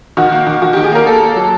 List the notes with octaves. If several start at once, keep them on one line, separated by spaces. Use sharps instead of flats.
D#3 F#4
A#3
D#3
D#3 F#4
D#3 G4
G#4
A#3 A#4
A#3 A4
A#3
F#3